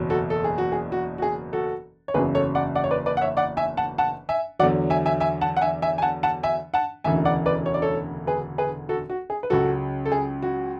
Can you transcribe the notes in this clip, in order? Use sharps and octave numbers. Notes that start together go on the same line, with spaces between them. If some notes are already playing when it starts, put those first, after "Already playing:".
Already playing: F#1 E2 B2 F#3
F#4 A4
A4
G#4
F#4
G#4
F#4
F#4
G#4
F#4 A4
C#5
F#1 E2 C#3 F#3 G#4 B4
A4 C#5
D5 F#5
D5 F#5
C#5
B4 D5
B4 D5
F#5
C#5 E5
D5 F#5
E5 G#5
F#5 A5
F#5 A5
E5 G#5
E2 D3 F#3 D5 F#5
E5 G#5
E5 G#5
E5 G#5
F#5 A5
F#5
E5 G#5
E5 G#5
G#5
F#5 A5
F#5 A5
E5 G#5
F#5 A5
E1 D2 C#3 E3 E5 G#5
D5 F#5
B4 D5
C#5
D5
A4 C#5
G#4 B4
G#4 B4
F#4 A4
F#4
G#4
B4
C#2 C#3 F#3 F#4 A4
A4
G#4
F#4